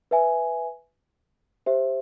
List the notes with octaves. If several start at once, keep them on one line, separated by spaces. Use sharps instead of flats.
B4 E5 G#5
G4 C5 E5